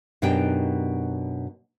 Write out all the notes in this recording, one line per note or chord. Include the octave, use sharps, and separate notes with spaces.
F#2 B2 D4 D#4 G4 G5